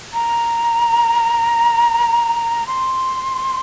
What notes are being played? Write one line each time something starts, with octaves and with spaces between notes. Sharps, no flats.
A#5
C6